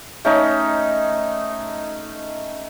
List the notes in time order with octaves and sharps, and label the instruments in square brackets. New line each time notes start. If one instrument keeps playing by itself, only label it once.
[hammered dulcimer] A3 C#4 D#4